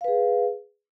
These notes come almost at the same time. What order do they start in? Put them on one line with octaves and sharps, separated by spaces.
F5 B4 G#4